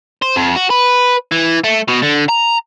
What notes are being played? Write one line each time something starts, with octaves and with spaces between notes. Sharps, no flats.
C5
F2
F#4
B4
E3
A3
B2
D3
A#5